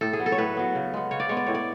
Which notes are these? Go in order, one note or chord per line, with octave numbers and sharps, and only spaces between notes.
A2 A4
G#4
F#3 B3
A4
C#5
A2 B4
F#3 B3
C#3
G#3 B3
C#3 C#5
D5
G#3 B3 C#5
D5
A2 C#5
D5